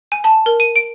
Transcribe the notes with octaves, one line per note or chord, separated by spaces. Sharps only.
G#5
A5
A#4
D#7
D7